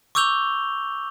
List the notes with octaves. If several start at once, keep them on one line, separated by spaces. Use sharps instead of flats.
C#6 D6 E6 G6 F7 G7